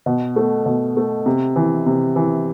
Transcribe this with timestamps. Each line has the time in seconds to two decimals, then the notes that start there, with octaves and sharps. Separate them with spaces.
0.06 B2
0.36 A3
0.66 B2
0.97 A3
1.26 C3
1.56 E3
1.86 C3
2.16 E3